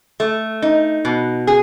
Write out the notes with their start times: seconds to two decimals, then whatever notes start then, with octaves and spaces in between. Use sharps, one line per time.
0.20 A3
0.62 D#4
1.05 B2
1.47 G#4